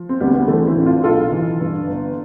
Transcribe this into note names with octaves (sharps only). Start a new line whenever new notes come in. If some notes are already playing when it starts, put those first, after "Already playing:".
Already playing: F3
C4
D2 G3 B3
G3 B3
E3 A3 C4
C4 E4
A2
D4 F4
B1 F4 A4
E3
G2
G1